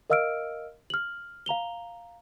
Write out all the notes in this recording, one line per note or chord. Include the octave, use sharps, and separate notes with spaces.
A#4 D#5 F5 E6 F6 D7
F6 F#7
F5 A#5 F7 G7